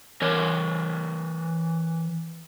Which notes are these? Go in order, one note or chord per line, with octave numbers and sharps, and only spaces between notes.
E3 A#4 C#5